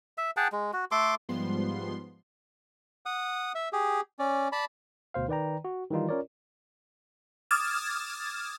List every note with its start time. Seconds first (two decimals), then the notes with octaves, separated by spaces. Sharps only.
0.18 E5
0.37 G#4 F#5 G5 A5
0.52 G#3
0.73 F#4
0.92 A3 A4 C6 D6
1.29 G#2 F3 G3 B3 C6
3.06 F#5 D#6
3.55 E5
3.73 G4 G#4
4.19 C#4 D5
4.52 D5 A5 B5
5.14 D2 B2 C5 F5
5.28 D#3 B4 D5 G5 A#5
5.65 F#4
5.90 D#3 E3 G3 D#4 F4
6.09 C#4 F4 A#4 C#5 D5
7.51 D6 D#6 F6 G#6 A6 E7